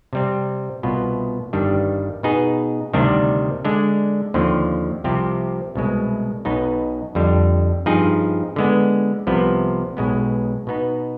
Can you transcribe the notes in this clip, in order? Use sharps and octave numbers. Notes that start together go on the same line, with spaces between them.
C3 G3 C4
C2 B2 B3 F4
G1 G2 D#3 G3 D4
B2 B3 D#4 G#4
D2 C3 D#3 G3 D4
D3 G#3 D4
D#2 D3 F3 C4
C2 C3 F3 C4 G4
C2 B2 G#3
B1 B2 B3 D#4
F2 D3 G3
G2 F3 C4 D#4 G#4
D3 G#3 B3
C2 C3 F3 B3
B1 B2 G#3 B3
B2 B3 D#4